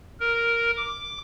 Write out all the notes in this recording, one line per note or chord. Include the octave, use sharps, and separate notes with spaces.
A#4
D6